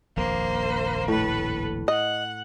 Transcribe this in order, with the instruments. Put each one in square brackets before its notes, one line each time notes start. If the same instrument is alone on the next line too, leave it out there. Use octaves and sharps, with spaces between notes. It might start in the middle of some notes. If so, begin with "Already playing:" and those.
[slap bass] D#1 A#1 F2 [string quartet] A#3 C5
[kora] A2 [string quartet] A4 B4
[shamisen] D#5 [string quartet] F#5